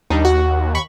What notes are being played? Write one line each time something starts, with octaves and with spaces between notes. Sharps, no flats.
D#2 G3 D4 D#4
F#4 F#5
B5 C#6